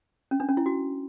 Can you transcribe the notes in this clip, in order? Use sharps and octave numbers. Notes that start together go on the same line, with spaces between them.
C#4
D4
C#4
E4
F#4